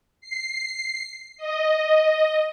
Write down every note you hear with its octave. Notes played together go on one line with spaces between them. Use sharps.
C7
D#5